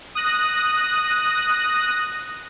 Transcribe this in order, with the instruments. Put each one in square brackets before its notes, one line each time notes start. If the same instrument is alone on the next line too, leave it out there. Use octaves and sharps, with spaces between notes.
[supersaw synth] D#6 F#6 A#6